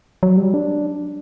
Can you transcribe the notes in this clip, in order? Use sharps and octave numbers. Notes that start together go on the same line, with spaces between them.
F#3
G3
D4